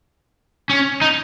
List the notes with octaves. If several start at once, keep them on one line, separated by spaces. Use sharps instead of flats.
C#4
D#4